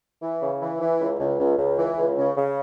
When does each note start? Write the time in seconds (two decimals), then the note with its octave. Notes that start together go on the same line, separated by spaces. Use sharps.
0.22 E3
0.42 C#3
0.62 E3
0.81 E3
1.00 C#2
1.19 C#2
1.39 C#2
1.58 C#2
1.78 E3
1.98 C#2
2.17 C#3
2.37 C#3